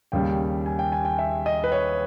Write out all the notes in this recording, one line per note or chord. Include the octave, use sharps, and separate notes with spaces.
D#2 C#3 G3 G5
G#5
G5
G#5
G5
E5
D#5
B4
C#5